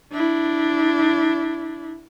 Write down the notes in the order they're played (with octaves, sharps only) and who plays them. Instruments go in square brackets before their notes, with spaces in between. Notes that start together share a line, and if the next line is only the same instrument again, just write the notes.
[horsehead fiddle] D4 E4